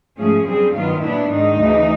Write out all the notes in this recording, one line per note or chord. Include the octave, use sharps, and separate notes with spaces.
G#2 F3 A3 C#4 G#4
F#2 D3 G3 C4 G#4
G2 D#3 F#3 B3 F4
A#2 F#3 B3 D4 E4
G#2 D#3 G#3 D#4
D2 C#3 E3